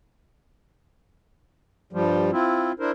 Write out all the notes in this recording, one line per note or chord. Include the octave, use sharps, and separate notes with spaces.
G2 F3 G3
C4 E4 F4
D4 E4 A#4 C5